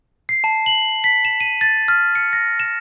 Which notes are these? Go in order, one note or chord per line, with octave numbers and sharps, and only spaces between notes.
C7
A5
F#7
B6
E7
D#7
A6
F6
C#7
A#6
E7